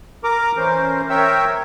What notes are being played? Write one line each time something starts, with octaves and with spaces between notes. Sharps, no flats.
A#4 A#5 D6
E3 C#4 A#4 C5
A#4 C#5 E5 G5 E6